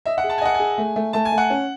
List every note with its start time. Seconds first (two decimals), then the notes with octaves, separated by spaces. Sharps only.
0.06 D#5 E5
0.18 F#5
0.24 G#4
0.29 A5
0.38 G#5
0.41 D#5 F#5
0.54 G#5
0.60 G#4
0.78 A3
0.96 A3
1.13 A3 A5
1.25 G#5
1.32 A3
1.38 F#5
1.50 C#4